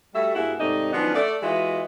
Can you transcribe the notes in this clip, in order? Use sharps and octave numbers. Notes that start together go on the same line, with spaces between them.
G3 A3 F#4 E5
G2 A#3 E4 F#4 G#4 F#5
G#2 C3 A3 D#4 D5 D#5
D#3 F3 F#3 B3 C#4 D4
A3 D5
E3 G#3 F4 F#4 D#5 E5